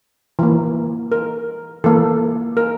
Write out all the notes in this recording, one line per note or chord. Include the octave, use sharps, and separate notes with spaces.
E3 A#3
A#4
E3 A#3 A4
A#4